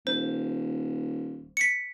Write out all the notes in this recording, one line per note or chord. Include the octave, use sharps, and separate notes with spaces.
D#1 C5
B6 C#7